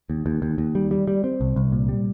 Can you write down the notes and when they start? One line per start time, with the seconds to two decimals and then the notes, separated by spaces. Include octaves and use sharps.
0.10 D#2
0.26 D#2
0.42 D#2
0.58 D#2
0.75 G3
0.91 G3
1.08 G3
1.24 C4
1.41 C2
1.56 C2
1.72 A#2
1.89 G3